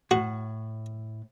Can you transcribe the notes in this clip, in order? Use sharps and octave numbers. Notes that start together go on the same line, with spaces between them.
A2 F#4